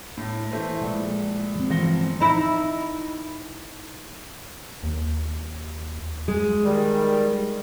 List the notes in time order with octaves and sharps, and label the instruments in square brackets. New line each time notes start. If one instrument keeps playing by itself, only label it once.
[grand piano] A2
E3 A3 C5
[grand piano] A#1 [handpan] G#3
[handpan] F3 C4
[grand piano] G1 A#6 G7 [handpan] E3
[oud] D#4 E4
[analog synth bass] D#2
[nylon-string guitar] G#3
[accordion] D#3 G3